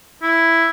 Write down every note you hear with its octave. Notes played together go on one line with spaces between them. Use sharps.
E4